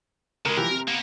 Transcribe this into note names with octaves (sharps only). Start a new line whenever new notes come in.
C#3 G#3 A#4
E3 F3 G4 A#4
C3
A#3 B3